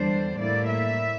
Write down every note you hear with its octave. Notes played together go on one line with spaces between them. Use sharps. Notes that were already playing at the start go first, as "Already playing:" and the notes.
Already playing: E2 D3 G3 D4 C5
A2 G3 A#3 E4 D5
E5